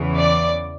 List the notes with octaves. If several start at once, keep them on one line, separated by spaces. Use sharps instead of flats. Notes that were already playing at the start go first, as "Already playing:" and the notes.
Already playing: E2 C#3 E3
D5